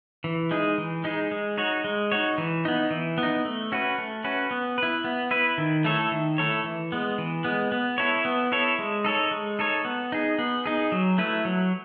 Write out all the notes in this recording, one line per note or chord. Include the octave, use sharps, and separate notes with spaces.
E3
G#3 D#4 G#4
E3
G#3 D#4 G#4
G#3
D#4 F#4 C#5
G#3
D#4 F#4 C#5
E3
B3 D#4
E3
B3
D#4
A3
C#4 F#4 B4
A3
C#4 F#4 B4
B3
E4 B4
B3
E4 B4
D#3
A3 E4 A4 C#5
D#3
A3 E4 A4 C#5
E3
G#3 B3
E3
G#3 B3
B3
E4 A4 C#5
B3
E4 A4 C#5
G#3
D#4 A4 C#5
G#3
D#4 A4 C#5
B3
D#4 G#4
B3
D#4 G#4
F#3
A3 E4 B4
F#3